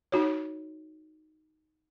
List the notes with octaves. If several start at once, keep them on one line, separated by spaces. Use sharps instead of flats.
D#4 F#4 C#5